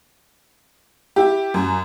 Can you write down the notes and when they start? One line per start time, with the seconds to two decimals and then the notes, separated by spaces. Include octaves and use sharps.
1.16 E4 G4
1.54 F#2